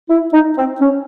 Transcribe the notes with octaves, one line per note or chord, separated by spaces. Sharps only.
E4
D#4
C4
C#4